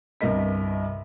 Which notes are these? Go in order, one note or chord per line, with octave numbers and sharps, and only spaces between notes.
G1 C2 G2 A#4 D#5 B6